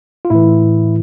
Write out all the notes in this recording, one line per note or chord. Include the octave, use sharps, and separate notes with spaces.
F4
A2 E3 E4